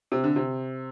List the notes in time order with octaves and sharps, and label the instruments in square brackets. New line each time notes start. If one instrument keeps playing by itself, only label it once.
[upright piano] C3
D3
C3